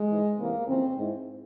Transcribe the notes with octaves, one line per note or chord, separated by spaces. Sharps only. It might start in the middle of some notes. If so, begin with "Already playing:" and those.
Already playing: G#3
G#2 E3
E2 C3 E3 A#3
F2 C#3 E3 C4
G#2 E3